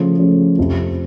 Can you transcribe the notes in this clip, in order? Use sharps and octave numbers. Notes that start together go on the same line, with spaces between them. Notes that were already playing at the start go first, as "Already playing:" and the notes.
Already playing: C#3 F3 A3
C#3 F3 A3
F2 C3 F3